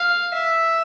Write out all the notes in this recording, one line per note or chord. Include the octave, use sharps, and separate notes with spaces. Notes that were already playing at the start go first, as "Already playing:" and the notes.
Already playing: F5
E5